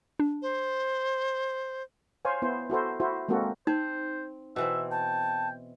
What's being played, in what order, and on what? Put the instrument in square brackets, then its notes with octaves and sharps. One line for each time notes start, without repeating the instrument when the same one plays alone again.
[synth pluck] D4
[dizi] C5
[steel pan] C5 C#5 F5 G#5
B3 E4 C5
E4 F#4 A4 C5
E4 F#4 C5
G#3 A#3 C4 F#4 A4
[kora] C4 [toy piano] D#4 [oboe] C5
[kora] B2 E3 C4 [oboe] E5
[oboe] G5 [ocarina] A5